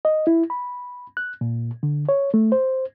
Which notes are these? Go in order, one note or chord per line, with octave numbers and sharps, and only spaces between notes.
D#5
E4
B5
F#6
A#2
D3
C#5
A3
C5